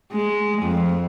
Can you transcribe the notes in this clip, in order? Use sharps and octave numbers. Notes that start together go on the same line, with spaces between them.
G#3
F2